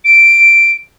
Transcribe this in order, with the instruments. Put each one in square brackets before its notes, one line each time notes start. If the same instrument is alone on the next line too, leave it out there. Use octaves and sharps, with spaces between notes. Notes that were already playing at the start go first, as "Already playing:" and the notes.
[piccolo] D7